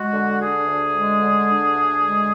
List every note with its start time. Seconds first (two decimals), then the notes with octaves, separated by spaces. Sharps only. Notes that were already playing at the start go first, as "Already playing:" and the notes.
Already playing: G#3 F#4
0.13 D3
0.39 D4 G#4
0.67 D2
0.94 G#3
1.20 D3
1.48 D4
1.74 D2
2.02 G#3